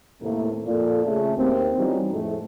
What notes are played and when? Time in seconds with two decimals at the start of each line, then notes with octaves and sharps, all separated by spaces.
0.20 D#2 A2 C3 A3 A#3
0.66 F2 A#2 F4 A4 D5
1.04 C#3 A3 C#4
1.36 D#2 C4
1.77 E3 G3 C#4 D#4 F4 F#4
2.11 F2 A2 G#3 A3